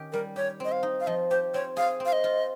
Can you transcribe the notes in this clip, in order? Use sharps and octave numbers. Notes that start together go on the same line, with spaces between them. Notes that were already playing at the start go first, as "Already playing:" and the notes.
Already playing: D#3 C#4 G4
G3 A#4
G4 C#5
C4 D#5
F5
D#4
F5
F3 D#5
G4 C5
C4 C#5
G#4 F5
C4
F5
D#5
F4